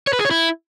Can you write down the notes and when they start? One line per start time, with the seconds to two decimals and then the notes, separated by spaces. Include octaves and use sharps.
0.07 C#5
0.13 B4
0.19 G#4
0.25 C#5
0.31 E4